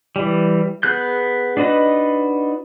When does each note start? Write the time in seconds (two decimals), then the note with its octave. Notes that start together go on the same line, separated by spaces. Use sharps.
0.16 E3 G3
0.83 B3 G#4 F#6 G6
1.57 D4 D#4 F#4 B4 D#5